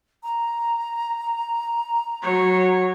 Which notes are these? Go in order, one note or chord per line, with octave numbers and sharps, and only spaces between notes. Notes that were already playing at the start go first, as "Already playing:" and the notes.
A#5
F#3 C#5